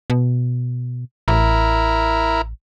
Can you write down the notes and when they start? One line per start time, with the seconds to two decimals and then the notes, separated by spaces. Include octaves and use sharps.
0.10 B2
1.28 A1 E4 A#4